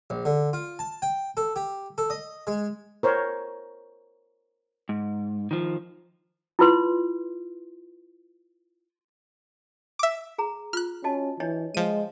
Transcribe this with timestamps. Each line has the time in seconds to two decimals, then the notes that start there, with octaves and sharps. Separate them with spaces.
0.10 A#1
0.25 D3
0.53 F4
0.79 A5
1.02 G5
1.37 A4
1.56 G4
1.98 A4
2.10 D#5
2.47 G#3
3.03 A#4 C5 C#5
4.89 G#2
5.51 D#3 F3
6.59 E4 F4 B4 C6
9.99 E5 D6
10.38 G#4 A#5
10.73 F4 F6 F#6
11.04 C#4 F#4 D#5 A5
11.40 E3 D4 C#5 D#5
11.74 F3 G#3 D#7